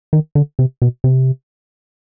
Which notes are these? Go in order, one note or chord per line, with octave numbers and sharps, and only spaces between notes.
D#3
D3
C3
B2
C3